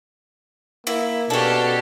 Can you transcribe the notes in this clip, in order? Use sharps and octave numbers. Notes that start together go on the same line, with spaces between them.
A#3 E4
B2 C#4 D4 G4 A4